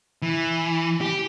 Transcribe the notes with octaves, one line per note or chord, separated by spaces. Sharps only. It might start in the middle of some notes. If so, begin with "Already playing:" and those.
E3
G4